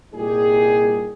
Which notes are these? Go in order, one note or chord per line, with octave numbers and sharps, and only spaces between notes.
C2 A#2 G3 D#4 G4 G#4